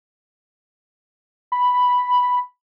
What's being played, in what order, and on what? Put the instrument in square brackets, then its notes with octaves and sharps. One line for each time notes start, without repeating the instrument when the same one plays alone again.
[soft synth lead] B5